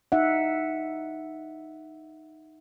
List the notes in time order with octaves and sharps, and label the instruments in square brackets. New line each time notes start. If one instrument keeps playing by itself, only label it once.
[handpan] D#4 E5 F#5